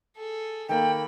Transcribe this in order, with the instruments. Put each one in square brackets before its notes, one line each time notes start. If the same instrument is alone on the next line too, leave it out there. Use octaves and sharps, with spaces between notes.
[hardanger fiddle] G#4 A4
[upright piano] D#3 A#3 [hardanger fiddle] A4 B5 [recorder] G5